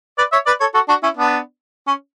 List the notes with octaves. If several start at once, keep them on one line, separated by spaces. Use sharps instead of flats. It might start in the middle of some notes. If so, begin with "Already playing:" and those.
B4 D5
C#5 E5
B4 D5
A4 C#5
F#4 A4
D4 F#4
C#4 E4
B3 D4
C#4